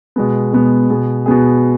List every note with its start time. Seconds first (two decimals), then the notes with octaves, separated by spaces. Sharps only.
0.16 B2 G#3 B3
0.53 B2 G#3 B3
0.90 B2 B3 G#4
1.26 B2 B3 G#4